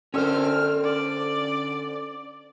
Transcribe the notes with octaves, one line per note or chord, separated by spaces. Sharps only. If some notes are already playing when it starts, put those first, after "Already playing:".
F#2 D3 C#4 C5 F6
D3 D5